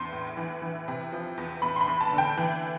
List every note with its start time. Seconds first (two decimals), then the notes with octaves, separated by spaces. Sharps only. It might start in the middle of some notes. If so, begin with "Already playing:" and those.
Already playing: E2 C6
0.13 A2
0.37 E3
0.62 E3
0.88 C3
1.12 F3
1.38 E2
1.62 E2 B5
1.76 C6
1.81 B5
1.88 E2
2.01 A5
2.12 D3
2.18 G5
2.37 E3